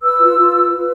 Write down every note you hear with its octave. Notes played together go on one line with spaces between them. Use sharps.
B4 E6
F4
F4
B4
B4